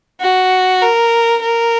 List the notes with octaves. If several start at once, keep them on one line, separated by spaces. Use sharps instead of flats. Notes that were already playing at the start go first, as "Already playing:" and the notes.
F#4
A#4
A#4